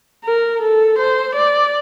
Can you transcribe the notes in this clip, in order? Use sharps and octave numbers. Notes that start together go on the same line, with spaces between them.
A#4
A4
C5
D5